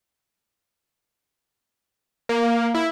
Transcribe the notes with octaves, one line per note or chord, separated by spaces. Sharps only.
A#3
E4